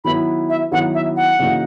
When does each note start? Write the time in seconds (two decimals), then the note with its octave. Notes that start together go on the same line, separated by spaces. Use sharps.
0.05 D#3 F#3 B3 E4 B5
0.49 E5
0.71 D#3 F#3 B3 E4 F#5
0.94 E5
1.16 F#5
1.39 C#3 E3 A#3 D#4 F#4